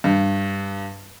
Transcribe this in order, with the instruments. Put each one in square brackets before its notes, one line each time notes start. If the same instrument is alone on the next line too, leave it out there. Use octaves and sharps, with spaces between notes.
[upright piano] G2